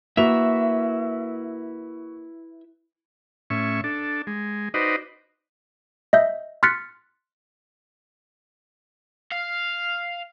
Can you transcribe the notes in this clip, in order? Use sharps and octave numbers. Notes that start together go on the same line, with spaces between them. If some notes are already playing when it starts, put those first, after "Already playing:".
A#3 E4 F#4 B4 E5 F7
A2 C#4 E5 C#6
D4 A4
G#3
D#4 F#4 B4 C5 D5 D#5
D#5 E5 G6
C6 F6 F#6 A6 B6 C#7
F5